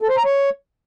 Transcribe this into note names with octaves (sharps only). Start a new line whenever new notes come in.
A4
C5
A#5
C#5